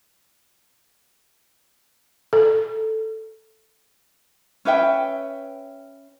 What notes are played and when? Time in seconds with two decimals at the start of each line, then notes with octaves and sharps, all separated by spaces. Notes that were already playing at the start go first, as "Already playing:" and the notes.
2.33 A4
4.65 C#4 B4 E5 G5